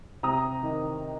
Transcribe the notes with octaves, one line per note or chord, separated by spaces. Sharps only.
C3 A#5 D#6
D#3